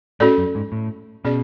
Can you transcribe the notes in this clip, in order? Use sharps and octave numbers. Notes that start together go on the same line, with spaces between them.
A2 C#4 F#4 A4 D5
F#2
G#2
A2
B2 C#4 G#4 D5